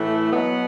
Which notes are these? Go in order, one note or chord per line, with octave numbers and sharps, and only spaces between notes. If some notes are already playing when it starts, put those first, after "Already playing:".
Already playing: A2 E3 A3
B2 F#3 B3